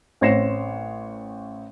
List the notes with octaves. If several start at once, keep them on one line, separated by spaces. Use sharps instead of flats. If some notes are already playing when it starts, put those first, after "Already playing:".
A1 C4 C#5 A#6 C7 E7